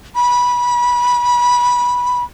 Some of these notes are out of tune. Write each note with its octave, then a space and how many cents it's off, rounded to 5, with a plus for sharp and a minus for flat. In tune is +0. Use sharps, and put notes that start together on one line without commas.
B5 -20